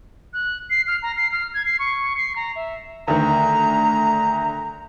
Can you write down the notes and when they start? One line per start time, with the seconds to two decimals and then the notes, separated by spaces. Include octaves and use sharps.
0.33 F#6
0.70 C7
0.87 F6
1.03 A#5
1.17 C7
1.32 F6
1.54 G#6
1.66 C7
1.79 C#6
2.17 C7
2.36 A#5
2.56 E5
3.08 D2 D#3 A#5